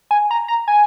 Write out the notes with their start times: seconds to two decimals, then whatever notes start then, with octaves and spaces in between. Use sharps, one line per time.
0.11 G#5
0.31 A#5
0.48 A#5
0.68 G#5